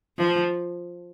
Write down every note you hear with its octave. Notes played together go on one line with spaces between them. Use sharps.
F3